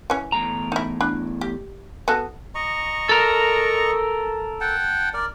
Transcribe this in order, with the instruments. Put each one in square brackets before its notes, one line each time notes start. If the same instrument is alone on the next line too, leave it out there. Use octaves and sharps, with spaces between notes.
[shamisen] E3 C#4
[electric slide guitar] E2 A2 A#5
[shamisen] D#4 E4
D4 B5
G4
B3 F#4 A4
[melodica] D#5 A#5 C#6
[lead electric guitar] A4 A#4
[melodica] F#5 G5 A5
A#4 D5